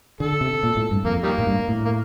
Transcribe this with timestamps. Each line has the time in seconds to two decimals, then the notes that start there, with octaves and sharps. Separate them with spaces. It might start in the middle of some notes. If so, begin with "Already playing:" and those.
0.20 D3 A4
0.41 C3
0.63 A#2
0.77 A2
0.91 G2
1.05 F2 A#3
1.23 D#3 G3 A#3
1.38 A2
1.47 G2
1.68 A2
1.85 A#3